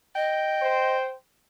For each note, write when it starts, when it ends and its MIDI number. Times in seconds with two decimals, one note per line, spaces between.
0.15 0.96 75
0.15 1.14 79
0.62 1.14 72